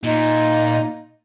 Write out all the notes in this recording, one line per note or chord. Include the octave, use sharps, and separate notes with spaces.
A#2 D#4